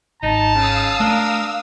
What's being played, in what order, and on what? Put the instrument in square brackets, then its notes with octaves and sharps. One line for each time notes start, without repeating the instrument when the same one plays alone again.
[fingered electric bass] G#1 [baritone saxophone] D#4 [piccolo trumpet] A5
[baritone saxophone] C#3 [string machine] F5 D#6 E6
[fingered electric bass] A3 [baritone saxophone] D4 [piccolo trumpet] A#4